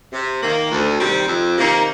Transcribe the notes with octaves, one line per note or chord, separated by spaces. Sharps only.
C3
D#3 A#3
D2
C3 D#3 G3 C4
F2
C3 D#3 A#3 D#4